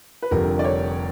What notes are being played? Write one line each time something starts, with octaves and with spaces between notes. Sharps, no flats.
B4
F1 F2 D3 G3 A#4
D5
C#5